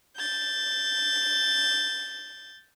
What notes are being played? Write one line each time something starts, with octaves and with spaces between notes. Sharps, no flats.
G6 A6